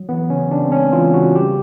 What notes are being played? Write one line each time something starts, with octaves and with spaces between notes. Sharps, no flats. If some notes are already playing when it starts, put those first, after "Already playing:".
Already playing: F#3
E3 B3
C#3 C#4
C#3 D4
C4
G#3 C#4
E3 F4
C#3 F#4
G3 G4